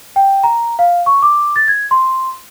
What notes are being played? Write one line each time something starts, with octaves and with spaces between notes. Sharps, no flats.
G5
A#5
F5
C#6
D6
A6
G#6
C6